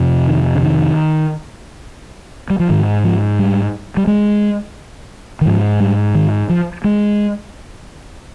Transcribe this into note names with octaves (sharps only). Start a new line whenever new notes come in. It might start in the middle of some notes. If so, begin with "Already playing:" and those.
Already playing: F2 C3
D#3
D3
D#3
G3
F3
G#2 D#3
F3
G3
G3
G#3
D#3
G#2 F3
G3
D#3
F3
G#3